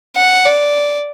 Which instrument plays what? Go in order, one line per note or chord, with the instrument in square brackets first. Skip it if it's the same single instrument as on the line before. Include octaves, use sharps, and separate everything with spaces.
[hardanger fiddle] F#5
D5